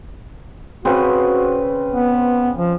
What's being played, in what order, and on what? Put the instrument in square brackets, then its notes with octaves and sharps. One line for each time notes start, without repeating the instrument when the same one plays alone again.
[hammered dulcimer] C#3 C4 B4 [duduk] F#4
[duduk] B3
F3